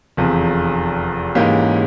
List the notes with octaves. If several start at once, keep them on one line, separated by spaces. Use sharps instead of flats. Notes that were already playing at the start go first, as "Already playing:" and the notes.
F1 E2 C3 F3
G#2 E3 A#3 C#4 G4